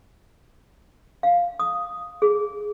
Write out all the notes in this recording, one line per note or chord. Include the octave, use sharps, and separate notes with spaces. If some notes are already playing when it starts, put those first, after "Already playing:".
F5
D#6
G#4